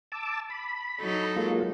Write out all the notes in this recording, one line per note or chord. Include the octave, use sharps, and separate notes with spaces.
A5 D6 E6
B5
F#3 D#4 A4
G#3 A#3 F4